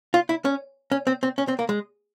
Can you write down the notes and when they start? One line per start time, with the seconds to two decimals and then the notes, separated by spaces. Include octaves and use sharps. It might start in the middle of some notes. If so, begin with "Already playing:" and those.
0.14 F4
0.29 E4
0.45 C#4
0.92 C#4
1.07 C4
1.23 C4
1.38 C#4
1.48 C4
1.59 A#3
1.69 G#3